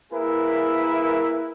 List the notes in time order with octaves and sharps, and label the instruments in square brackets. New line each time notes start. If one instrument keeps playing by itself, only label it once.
[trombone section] A#3 E4 G#4 A#4 B4